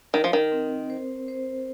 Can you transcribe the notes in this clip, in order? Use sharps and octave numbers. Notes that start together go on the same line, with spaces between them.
D#3 A#4
F3
D#3
C4
C5
C5